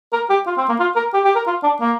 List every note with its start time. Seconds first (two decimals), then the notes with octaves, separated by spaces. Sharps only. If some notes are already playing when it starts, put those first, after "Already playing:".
0.13 A#4
0.30 G4
0.47 F4
0.58 C4
0.69 A#3
0.80 F4
0.96 A#4
1.14 G4
1.25 G4
1.36 A#4
1.47 F4
1.64 D4
1.81 A#3